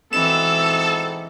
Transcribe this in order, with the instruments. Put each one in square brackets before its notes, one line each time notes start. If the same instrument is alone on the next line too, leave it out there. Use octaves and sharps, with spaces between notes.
[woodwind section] G#2 B2 C4 [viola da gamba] E3 [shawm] A4 [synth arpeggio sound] E7